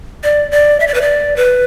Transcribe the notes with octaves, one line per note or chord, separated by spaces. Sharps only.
D5
D5
E5
D5
B4
D5
B4